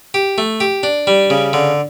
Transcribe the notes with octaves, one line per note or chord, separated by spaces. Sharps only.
G4
A3
G4
D4
G3
C#3
D3